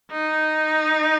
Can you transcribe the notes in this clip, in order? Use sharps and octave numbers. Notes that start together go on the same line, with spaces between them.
D#4